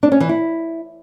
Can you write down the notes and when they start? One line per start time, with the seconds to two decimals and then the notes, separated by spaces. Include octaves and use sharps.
0.03 D4
0.12 C#4
0.20 E3
0.29 E4